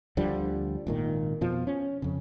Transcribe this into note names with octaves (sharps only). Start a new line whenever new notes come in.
D2 D3 F3 G3
G#1 A#2 D#3
F2 B2 F3
C#4
F2 C#3